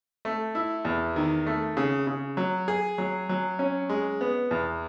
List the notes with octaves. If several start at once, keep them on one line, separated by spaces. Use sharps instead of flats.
A3
E4
E2
D#3
A3
C#3
C#3
F#3
G#4
F#3
F#3
C#4
G#3
B3
E2